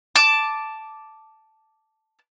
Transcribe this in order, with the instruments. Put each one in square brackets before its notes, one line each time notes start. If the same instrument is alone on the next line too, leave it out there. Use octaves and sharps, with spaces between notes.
[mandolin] A5 D6